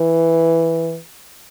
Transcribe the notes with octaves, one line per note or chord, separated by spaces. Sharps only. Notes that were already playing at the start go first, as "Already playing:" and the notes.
Already playing: E3